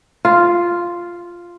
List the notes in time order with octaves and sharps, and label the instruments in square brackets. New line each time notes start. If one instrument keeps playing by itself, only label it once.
[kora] F4